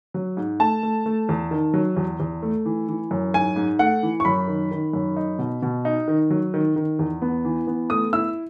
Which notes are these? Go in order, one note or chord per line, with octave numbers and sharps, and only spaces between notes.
F#3
G#2
A3 A5
A3
A3
E2
D#3
F#3
E2
E2
A3
E3
E3
F#2
G#2 G#5
G#2
A3 F#5
E3
C#6
F#2 B5
D#3
D#3
F#2
D#4
B2
B2
D#4
D#3
F#3
D#3
D#3
E2
B3
E3
B3
A3 D#6
E4 E6